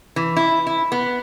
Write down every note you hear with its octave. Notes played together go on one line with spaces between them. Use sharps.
E3
E4
E4
B3